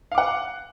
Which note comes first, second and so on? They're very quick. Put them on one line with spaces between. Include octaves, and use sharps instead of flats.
F5 D6 F#5